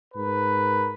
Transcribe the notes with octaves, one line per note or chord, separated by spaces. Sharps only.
G#2 A#4 B4